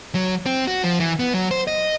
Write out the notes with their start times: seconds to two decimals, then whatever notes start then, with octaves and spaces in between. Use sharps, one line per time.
0.15 F#3
0.46 C4
0.67 F#4
0.84 F3
1.00 E3
1.19 B3
1.34 F#3
1.51 C5
1.67 D#5